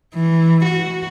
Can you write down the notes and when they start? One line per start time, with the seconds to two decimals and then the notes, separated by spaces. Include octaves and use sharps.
0.14 E3
0.65 F#4